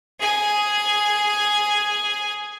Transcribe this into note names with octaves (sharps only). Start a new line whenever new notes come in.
G#4 G#5